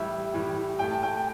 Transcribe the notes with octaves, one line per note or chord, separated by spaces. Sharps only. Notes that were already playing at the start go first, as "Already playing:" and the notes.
Already playing: A2 E3 G3 E5
A2 E3 G3
A2 A3 G5
A5
G5